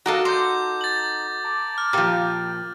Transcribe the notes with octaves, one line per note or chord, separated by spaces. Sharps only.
F#4 A4 A#4 D5 D#5 F5
D#4 A#5 C6 D6 G6
A6 F#7
A5 A#5 D6
F6
A#2 F3 G4